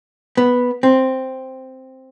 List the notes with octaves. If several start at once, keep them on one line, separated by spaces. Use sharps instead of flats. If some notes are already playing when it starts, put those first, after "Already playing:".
B3
C4